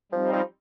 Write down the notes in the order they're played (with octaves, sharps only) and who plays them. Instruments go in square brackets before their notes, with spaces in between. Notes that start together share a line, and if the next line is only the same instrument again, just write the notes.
[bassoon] F3 [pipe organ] G3 C4 D#4
[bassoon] F3